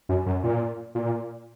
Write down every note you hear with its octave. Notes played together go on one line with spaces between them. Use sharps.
F#2
F#2
A#2
A#2